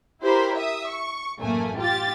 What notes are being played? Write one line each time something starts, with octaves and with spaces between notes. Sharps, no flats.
E4 G4 A#4 C5 B5
E5 D#6
C#6
A1 F#2 A3 A#3 G#5
F4 G4 A6